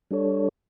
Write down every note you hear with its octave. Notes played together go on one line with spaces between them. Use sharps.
G3 D4 A4 C#5